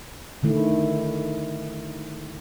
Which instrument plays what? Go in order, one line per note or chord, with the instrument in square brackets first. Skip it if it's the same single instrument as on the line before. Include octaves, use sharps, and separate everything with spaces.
[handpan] D3 D#3 A3 E4